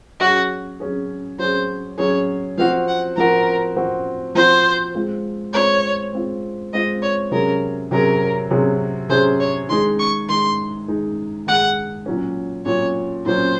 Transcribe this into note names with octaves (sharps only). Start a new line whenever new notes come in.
F#3 C#4 F#4 G#4
F#3 C#4 G#4
F#3 C#4 G#4 C5
F#3 C#4 G#4 C#5
F3 C4 F#4 F5
F#5
F3 C4 F#4 A#4
F3 C4 F#4
F3 C4 F#4 C5
G#3 C4 F4
G#3 C4 F4 C#5
G#3 C4 F4
G#3 C4 F4 D#5
C#5
C3 F#3 C#4 G#4 A#4
C3 F#3 C#4 G#4 A#4
C3 F#3 C#4 G#4
C3 F#3 C#4 G#4 C5
C#5
D#3 G#3 D#4 G#4 C6
C#6
D#3 G#3 D#4 G#4 C6
D#3 G#3 D#4 G#4
D#3 G#3 D#4 G#4 F#5
A#2 F#3 C#4
A#2 F#3 C#4 C#5
A#2 F#3 C#4 C5